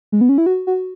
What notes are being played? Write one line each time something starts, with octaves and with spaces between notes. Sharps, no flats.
G#3
B3
C#4
E4
F#4
F#4